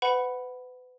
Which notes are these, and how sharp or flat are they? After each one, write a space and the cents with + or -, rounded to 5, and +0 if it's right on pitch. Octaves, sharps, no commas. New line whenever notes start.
B4 +35 F#5 +0 B5 +0